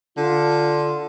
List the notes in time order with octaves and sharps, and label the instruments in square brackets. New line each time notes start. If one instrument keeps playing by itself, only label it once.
[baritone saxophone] D3 [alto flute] F4